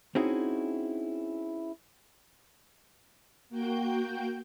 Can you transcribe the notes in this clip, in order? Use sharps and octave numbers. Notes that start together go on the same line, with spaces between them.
C4 C#4 D#4 E4 F#4 G#4
A#3 F#4 G5 G6